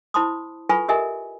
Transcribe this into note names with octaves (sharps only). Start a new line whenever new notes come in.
E4 C5 A5 B5 C6 D#6
F4 A4 B4 G#5 B5 C#6
G4 A4 A#4 D#5 E5 G#5